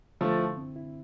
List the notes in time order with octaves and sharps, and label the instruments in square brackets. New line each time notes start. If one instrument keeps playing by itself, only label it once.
[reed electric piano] D3 [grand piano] F3 A3
[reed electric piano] E4
C4
E4